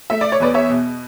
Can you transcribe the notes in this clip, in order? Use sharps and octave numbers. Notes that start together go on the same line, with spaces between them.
A3 E5
D5
C#5
E2 B4 D5
C#5 E5
B2